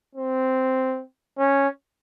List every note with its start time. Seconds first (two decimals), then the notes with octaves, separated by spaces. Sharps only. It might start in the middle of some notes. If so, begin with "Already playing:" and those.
0.15 C4
1.39 C#4